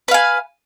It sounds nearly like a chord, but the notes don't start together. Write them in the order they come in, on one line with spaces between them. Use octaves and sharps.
B4 F5 G#5